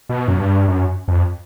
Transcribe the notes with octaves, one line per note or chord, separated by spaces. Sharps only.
B2
F#2
G2
F#2
F2